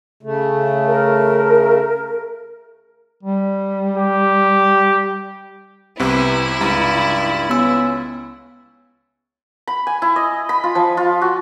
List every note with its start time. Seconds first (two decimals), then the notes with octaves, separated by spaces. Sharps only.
0.23 C#3 A3
0.88 A#4
3.23 G3
3.97 G4
5.99 C2 C3 B3 E4
6.61 C#2 G2 A#5
7.50 B3 C#4 E6
9.67 B5
9.87 G#5
10.02 E4
10.16 D#5
10.49 B5
10.64 F4
10.75 F3
10.97 F4
11.21 F#4